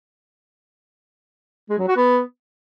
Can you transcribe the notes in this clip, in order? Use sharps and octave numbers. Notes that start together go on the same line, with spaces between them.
G#3
F#3
F#4
B3